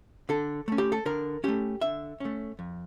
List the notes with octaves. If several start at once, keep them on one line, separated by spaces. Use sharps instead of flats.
D3 A4
A3 C#4
G4
A4
D3 A#4
A3 C#4 G4
D3 E5
A3 C#4
F2